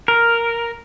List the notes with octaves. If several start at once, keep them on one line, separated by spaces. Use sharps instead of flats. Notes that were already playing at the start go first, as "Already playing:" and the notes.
A#4